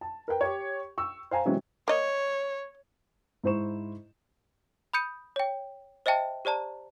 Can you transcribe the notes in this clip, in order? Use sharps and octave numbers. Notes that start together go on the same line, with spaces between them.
A5
A#4 B4 G5
G4 C#5
C#6 E6
C5 F5 G#5 A#5
C3 E3 F#3 G#3 C4 C#4
A#3 C#5 D#5
G#2 E4 C5 C#6 E7
B5 D#6 G6 C#7 D#7
C#5 G5
C5 D#5 E5 G5 A5
G4 C5 D5 A5 A#5